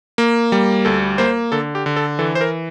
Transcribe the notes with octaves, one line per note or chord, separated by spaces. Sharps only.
A#3
G3
D2 A4
A#3 C5
D3 A4
G4
D3
A4
E3 A4
C5
A#4